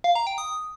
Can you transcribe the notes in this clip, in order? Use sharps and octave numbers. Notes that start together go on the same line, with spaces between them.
F5
A#5
G5
D#6